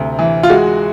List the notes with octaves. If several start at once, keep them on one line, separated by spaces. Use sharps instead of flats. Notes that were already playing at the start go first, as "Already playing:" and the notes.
Already playing: D2 C3
E3
F4
G#3 F#4